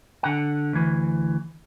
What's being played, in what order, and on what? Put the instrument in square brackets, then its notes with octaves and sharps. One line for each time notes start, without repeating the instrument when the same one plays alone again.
[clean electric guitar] D3 F#5
D2 E3